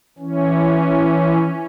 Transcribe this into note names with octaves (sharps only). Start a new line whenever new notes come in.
E3 C#4